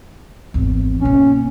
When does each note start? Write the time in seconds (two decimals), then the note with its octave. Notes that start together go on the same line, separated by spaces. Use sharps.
0.54 G#1 E2
1.01 B2 A#3 C#4